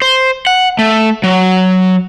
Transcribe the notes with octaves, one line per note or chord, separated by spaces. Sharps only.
C5
F#5
A3
F#3